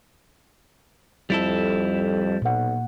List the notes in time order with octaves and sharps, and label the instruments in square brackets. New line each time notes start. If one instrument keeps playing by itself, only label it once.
[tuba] F2 [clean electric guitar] G3 E4 A4
[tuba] B1 [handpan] A#2 F#5